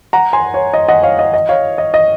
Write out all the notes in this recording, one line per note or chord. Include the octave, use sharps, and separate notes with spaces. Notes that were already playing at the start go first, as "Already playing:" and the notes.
F#5 A#5
G#5 C6
C#5
D#5
D#5 F#5
C#5 F5
D#5
D#5
C#5 F5
D#5
D#5